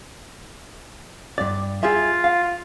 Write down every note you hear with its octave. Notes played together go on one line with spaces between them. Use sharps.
G2 D5
F4 G4 G#4 E5
F5